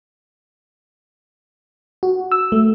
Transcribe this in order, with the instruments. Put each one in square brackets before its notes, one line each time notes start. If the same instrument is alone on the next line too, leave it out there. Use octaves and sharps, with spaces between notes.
[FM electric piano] F#4
E6
A3